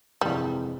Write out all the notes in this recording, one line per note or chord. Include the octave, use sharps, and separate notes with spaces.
G1 F2 C3 E3 G3 G#3